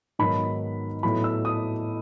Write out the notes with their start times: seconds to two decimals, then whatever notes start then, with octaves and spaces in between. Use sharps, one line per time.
0.19 G#2 D#3 F#3 B3 B5
1.03 A2 F#3 B3 B5
1.24 E6
1.45 D#6